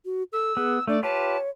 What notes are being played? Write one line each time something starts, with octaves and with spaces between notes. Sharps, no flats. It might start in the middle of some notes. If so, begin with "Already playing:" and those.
F#4
A4 E6
B3 G#4
A3 D4 D5
F4 G4 B4 C#5 A5